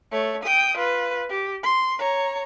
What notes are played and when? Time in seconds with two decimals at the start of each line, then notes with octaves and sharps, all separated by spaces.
0.12 A3 C#5
0.44 G5 D#6
0.78 F4 B4
1.30 G4
1.63 C6
1.99 C#5 A#5